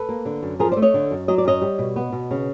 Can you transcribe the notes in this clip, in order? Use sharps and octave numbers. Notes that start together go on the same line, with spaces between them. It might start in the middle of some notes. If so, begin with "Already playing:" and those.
Already playing: A4 B4
A#3
D3
F#2
F3 G#4 A#4
A3 C5 D5
C#5 D#5
D3
F#2
F#3 D#5
D5
F#2 C#5 D#5
G3
B2
B3
B2
C#3